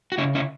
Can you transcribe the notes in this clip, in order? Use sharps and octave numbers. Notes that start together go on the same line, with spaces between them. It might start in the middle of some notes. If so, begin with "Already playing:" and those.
F#4
C#3 C#4 E4
C#4 E4